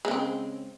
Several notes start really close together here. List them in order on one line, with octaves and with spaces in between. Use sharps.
G#3 C#3 C4